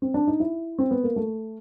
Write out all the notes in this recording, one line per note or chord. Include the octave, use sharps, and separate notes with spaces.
C4
D4
D#4
E4
C4
B3
A#3
A3